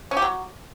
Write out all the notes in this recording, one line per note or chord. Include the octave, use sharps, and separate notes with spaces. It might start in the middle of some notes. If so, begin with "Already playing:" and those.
C#4
G4
F#3